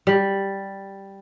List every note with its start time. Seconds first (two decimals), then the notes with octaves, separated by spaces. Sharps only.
0.07 G3